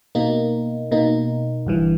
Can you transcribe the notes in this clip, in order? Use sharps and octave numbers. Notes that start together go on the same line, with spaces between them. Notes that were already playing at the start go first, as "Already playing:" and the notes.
B2 A#3 D#4
B2 A#3 D#4
G1 G2 E3